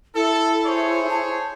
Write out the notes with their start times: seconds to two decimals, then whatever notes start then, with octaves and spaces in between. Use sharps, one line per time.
0.15 E4 A4
0.65 G#4 C5 C#5
1.10 A5